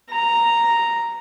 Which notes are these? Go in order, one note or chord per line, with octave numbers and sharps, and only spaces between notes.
A#5